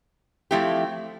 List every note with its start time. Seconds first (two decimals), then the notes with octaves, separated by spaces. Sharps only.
0.51 F3 A3 C4 E4 G4